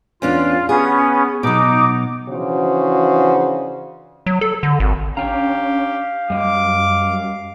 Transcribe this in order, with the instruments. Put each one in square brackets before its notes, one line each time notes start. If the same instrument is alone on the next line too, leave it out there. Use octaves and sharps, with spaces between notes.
[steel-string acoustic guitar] E2 C#4 D4 [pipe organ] F4
[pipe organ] B3 C#4 [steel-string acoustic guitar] G#4
[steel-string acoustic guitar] B2 F#3 [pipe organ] D#4 D6
[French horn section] C#3 E3 F3 D4 F#4 C5
[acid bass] F#3
A4
D3
G#1
[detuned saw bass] C#4 [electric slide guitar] D4 G5 A#5 [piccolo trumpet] G4 [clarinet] F5
[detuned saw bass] F#2 [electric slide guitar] G3 D#5 [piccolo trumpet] D6